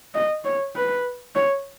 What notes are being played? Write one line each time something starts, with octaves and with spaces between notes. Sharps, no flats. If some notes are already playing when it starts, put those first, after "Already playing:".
D#5
C#5
B4
C#5